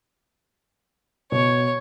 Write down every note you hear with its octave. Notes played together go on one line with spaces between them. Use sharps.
B2 C#5